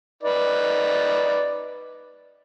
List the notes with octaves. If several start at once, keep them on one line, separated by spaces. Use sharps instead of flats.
D#4 B4 D5